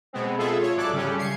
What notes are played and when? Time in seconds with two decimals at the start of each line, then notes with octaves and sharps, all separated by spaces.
0.13 B2 G#3 B3 C4
0.38 C4 F4 G#4 A4 E5
0.58 F4 C#5
0.77 G#1 F#3 A4 D5 D6 F#6
0.93 C#3 G3 A3 C#4 G4
1.18 G#6 C7 C#7